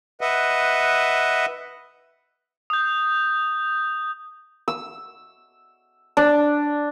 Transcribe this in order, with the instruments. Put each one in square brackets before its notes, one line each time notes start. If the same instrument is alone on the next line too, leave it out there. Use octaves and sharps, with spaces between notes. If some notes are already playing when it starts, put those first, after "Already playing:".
[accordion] B4 D#5 E5 F#5
[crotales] D#6 G6
[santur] E6
D4